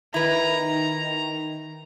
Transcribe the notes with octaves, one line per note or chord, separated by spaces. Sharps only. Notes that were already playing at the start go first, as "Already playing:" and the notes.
D#3 E4 B4 A#5